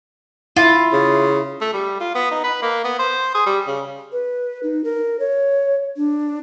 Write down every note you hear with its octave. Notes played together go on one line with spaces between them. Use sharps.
E4 F4
C#3
A3
G3
F4
B3
D#4
B4
A#3
B3
C5
G#4
G3
C#3
B4
D#4
A#4
C#5
D4